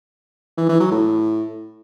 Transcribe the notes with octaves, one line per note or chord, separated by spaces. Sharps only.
E3
E3
F#3
A2